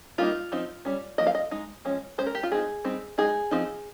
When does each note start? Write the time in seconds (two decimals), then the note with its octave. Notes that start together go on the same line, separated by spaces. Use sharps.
0.18 G3 A#3 D#4 F4
0.52 F3 C4 D#4
0.85 G3 C#4
1.18 F3 A#3 D#4 D#5
1.27 F5
1.35 D#5
1.51 G#3 D#4
1.85 F3 G#3 C#4
2.18 G#3 C#4 C5
2.26 A#4
2.35 G4
2.43 F4
2.51 G#3 C4 D#4 G#4
2.84 G3 C4 D#4
3.18 G#3 D#4 G#4
3.51 F3 C4 D#4